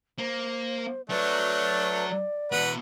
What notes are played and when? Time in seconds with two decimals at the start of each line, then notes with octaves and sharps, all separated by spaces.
0.18 A#3 C5
1.10 F#3 A3 D4 B4
2.11 D5
2.52 E2 B2 B4 F#5